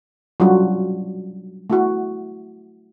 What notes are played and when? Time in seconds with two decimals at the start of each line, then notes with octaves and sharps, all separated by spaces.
0.40 F#3 G3 C#4 D4 F4 F#4
1.70 A3 E4 F#4